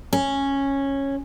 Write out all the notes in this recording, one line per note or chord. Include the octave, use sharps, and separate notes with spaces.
C#4